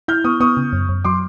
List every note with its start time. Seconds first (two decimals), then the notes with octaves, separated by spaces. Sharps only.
0.08 E4 F6 G6
0.24 B3 C#6 D#6
0.40 B3 C#6 D#6
0.57 C#3
0.73 F#2
0.89 F#2
1.05 F#3 C6 D6